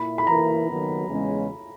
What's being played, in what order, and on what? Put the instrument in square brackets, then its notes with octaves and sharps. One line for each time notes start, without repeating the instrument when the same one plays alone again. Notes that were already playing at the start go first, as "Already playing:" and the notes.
Already playing: [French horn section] A#2 E4 [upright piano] B5
[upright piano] B5
[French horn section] E3 A#3 E4 A#4 [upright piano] A#5
[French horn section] D#3 F#3 B3
E2 C#3 G#3 C#4